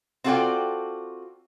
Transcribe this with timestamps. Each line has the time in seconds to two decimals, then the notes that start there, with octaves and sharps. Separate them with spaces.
0.24 C4 F4 F#4 A4 D5 G5